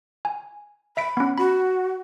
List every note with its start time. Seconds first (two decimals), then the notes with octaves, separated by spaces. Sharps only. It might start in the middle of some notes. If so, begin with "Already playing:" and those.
0.25 G#5
0.97 E5 B5 B6 D7
1.17 B3 C#4
1.38 F#4 B5